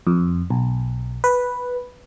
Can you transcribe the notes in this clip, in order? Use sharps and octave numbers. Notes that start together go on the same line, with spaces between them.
F2
B1
B4